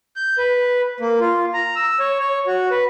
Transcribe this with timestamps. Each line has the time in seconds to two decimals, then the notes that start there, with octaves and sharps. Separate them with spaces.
0.16 G6
0.38 B4
1.00 A#3
1.21 F4
1.54 A#5
1.76 E6
1.99 C#5
2.19 C#5
2.47 F#4
2.71 B4